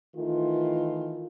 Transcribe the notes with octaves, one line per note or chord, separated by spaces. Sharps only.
D#3 E3 A3 F4